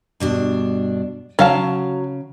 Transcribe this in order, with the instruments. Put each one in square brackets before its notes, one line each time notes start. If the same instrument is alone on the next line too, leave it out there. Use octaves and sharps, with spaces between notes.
[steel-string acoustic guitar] G2 B2 D4
[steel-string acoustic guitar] C#3 [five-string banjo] F#3 F5 A5